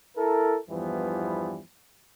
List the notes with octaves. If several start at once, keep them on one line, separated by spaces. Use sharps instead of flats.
E4 A4 A#4
E2 G2 E3 F3 G3 B3